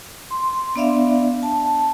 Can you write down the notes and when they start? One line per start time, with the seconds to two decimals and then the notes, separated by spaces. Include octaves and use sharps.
0.31 C6
0.76 B3 D4 D5 E5 F5
1.43 A5